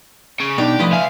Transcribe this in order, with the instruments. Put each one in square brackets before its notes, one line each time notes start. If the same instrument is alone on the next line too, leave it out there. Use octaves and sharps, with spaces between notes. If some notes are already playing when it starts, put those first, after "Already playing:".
[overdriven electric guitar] C#3
[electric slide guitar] B2 D#4 [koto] D4 [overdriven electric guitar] G4
[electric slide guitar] A2 F3 [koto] F4 B4 D#5
[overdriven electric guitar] C#2 F5 [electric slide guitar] E5 G#5